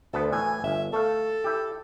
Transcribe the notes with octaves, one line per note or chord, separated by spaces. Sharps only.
D2 B3 A4
A2 E3 G#5
G1 E5
A3 A4 F5
E4 G4